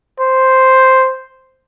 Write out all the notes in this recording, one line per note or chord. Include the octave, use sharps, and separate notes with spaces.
C5